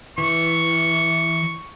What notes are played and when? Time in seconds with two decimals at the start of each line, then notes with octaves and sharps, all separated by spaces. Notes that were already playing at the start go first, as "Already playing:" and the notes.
0.18 E3 C#6